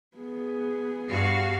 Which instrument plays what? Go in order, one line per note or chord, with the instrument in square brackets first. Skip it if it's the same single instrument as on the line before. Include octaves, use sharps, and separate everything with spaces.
[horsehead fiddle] B3 G#4
[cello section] G2 F#4 F5